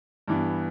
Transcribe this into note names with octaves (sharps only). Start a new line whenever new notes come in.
G2 E3 B3